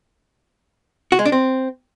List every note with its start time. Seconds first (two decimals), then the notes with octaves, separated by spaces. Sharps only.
1.12 F#4
1.19 G#3
1.26 D4
1.32 C4